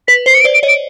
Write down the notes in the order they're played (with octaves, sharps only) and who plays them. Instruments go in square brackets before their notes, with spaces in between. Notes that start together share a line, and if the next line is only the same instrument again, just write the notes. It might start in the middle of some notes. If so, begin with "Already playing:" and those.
[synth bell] B4 [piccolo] B6
[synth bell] C5 [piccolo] C7
[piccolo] C#7
D7
[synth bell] C5 D5
[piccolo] D7
[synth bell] C#5 D#5
[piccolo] D7